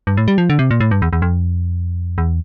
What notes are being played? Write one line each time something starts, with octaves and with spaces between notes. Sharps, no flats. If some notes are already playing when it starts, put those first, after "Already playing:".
G2
A2
G3
F3
D3
C3
A#2
A2
G2
E2
E2
F2
E2